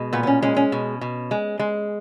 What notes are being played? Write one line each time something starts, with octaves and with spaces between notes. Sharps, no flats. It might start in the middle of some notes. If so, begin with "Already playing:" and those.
Already playing: B2 G#3
A#2 B3
B3
C#4
G#3 C#4
C#4
B2
B2
G#3
G#3